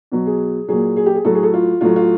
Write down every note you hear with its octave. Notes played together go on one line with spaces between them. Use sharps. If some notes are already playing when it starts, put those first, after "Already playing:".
B2 F#3
G#4
A#2 F#3 G#4
G#4
G4
G#4
A2 F#3 A4
G#4
A4
F4
A2 F#3 F4
F4